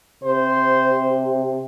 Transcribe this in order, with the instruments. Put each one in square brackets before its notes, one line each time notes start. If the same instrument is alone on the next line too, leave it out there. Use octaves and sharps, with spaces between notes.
[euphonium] C3 [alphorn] C5